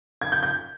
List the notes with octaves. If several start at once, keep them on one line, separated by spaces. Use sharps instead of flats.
G#6
G6
G6